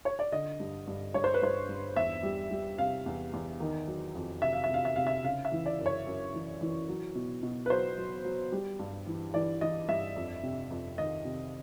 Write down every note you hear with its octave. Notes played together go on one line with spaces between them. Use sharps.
C#5
D5
D3 D#5
G2
G2
G2 C#5
C5
B4
G2 C5
G2
E2 E5
G3
G3
C3 F5
E2
E2
D#3
F#3
F2
C3 E5
F5
E5
C3
F5
E5
C3 F5
E5
C#3 F5
E5
E3
D5
F#2
C#5
F#2
E3
E3
F#3
B2
B2
B4
F#3 C5
F#3
F#3
G3
G2
E3
E3 D5
E3 D#5
G2 E5
F2
C3
F2
D#3 D#5
C3